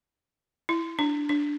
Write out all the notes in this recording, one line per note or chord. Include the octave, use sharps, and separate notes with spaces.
E4
D4
D4